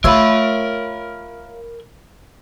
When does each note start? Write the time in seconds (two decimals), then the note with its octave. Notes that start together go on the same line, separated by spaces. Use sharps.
0.04 A3 F4 A#4 C#5 E5 B5